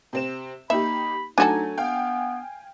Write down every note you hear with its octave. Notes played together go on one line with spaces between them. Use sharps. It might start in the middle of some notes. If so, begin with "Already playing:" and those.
C3 C4 E7
A#3 D#4 G4 E5 B5
F#3 A3 D4 D#4 F#4 A4 G#5
B3 F5 G5